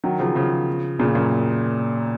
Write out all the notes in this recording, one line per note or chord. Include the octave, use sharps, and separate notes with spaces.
D#3 F#3
C#3 F3
C#3 F3
A#2 C#3
F#2 A#2